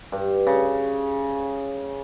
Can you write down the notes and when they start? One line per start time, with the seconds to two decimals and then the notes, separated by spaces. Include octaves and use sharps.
0.12 G2
0.47 C#3